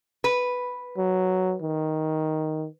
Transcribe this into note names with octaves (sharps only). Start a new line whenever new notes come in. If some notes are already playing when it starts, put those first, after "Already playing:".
B4
F#3
D#3